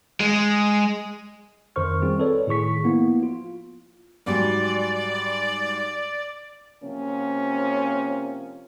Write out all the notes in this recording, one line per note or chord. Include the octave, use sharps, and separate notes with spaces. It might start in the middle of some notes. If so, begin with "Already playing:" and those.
G#3
F2 D#3 A#4 C5 C#6 F6
G3 C4 F4 G#4
A4 B4 C#5 D5
A2 D#3 G#4 C#6 B6
F3 A#3 B3 E4
F4
G#2 F#3 G3 D5
C3 F3 A#3 C#4